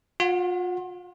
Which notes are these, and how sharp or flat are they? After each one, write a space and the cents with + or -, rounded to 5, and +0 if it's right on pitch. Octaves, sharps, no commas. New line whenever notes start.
F4 +35 F#5 -5